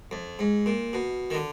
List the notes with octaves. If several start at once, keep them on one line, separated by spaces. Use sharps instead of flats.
F2
G#2
A#2
B2
D#3
D3